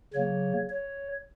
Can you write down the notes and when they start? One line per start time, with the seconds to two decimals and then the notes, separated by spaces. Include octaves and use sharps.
0.14 C#3 F#3 A#3 C#5
0.70 C#5